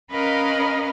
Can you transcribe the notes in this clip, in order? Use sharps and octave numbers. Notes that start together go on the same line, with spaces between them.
C#4 A#4 B4 D#5 F5 B5